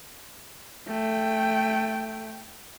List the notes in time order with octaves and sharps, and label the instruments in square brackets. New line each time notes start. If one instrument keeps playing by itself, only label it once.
[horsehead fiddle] A3 G5